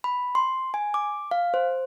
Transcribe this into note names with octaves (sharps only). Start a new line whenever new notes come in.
B5
C6
G#5
D6
F5
C5